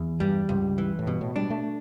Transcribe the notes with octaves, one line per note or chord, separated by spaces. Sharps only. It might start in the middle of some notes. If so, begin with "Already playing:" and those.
Already playing: E2
G2 G3
C#2 G2
E3
A2
G2 B2
A2
G3 D4
A3